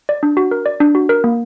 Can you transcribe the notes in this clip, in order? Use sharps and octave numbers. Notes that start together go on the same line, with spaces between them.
D5
D4
F#4
A#4
D5
D4
F#4
A#4
A#3